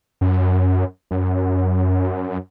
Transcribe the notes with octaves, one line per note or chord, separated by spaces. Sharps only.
F#2
F#2